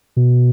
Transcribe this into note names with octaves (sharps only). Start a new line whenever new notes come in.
B2